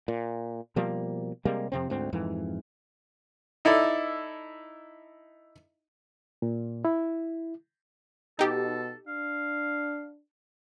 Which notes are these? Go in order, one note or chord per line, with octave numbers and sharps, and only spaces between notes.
A#2
B2 F3 G3 A#3
C3 G3 G#3 A#3
F2 C3 C4
D2 G#2 C4
F2 G#2 E3
D#4 E4 A4 D5
A#2
E4
B2 D#4 G4 A4
D4 F5